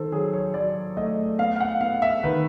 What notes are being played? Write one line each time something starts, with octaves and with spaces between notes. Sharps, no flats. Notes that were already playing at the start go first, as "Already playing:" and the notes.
Already playing: D#3 A4 C5
F#3 G#4
C#5
F#3 D5
A3 D#5
B3 F5
F5
F#5
B3 F5
E5
D#3 B4